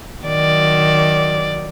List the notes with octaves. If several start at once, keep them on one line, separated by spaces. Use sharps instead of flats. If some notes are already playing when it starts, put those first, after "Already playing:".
D#3 F#3 D5